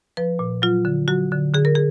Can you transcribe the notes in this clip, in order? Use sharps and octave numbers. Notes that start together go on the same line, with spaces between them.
F3 B4
A#2
F#3 F4
D3
F#3 F#4
D3
D3 G#4
A#4
G#4